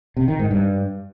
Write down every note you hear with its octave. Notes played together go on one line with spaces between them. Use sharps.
C3
D#3
G#2
G2